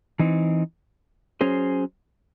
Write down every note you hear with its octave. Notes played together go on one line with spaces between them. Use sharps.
E3 C4 D#4
F#3 C#4 G#4 C5